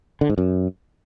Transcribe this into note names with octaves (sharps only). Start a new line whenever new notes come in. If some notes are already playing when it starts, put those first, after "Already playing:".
D3
G#2
F#2